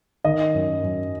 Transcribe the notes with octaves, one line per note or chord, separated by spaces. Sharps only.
D#3 D#5
F#2
F#2